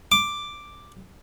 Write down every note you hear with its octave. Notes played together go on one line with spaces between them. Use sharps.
D6